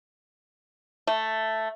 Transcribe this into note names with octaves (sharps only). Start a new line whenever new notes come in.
A3